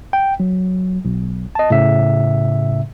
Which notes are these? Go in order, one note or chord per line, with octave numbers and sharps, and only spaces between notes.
G5
F#3
B1
D#5 A5
A2 C#3 E5